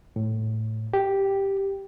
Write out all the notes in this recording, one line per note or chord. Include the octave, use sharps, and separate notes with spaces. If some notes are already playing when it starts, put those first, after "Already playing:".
A2
G4